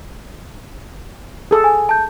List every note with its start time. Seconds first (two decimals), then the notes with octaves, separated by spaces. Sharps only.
1.51 G#4 A4
1.64 G#5
1.89 A5 G6